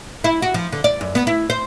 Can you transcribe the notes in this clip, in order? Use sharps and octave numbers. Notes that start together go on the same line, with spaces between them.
E4
F#4
F3
D3
D5
F#2
B3
E4
C5